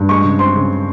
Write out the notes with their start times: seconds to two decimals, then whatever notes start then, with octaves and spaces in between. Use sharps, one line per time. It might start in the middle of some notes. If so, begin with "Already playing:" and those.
Already playing: G2
0.09 G#3 C#6
0.24 C#3
0.39 C4 C6
0.55 C#3